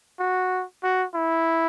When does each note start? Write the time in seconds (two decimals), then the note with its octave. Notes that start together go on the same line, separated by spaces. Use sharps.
0.20 F#4
0.83 F#4
1.15 E4